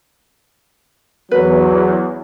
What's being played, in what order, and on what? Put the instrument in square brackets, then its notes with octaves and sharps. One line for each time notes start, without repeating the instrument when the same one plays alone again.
[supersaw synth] E2 [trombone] F#3 [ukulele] B4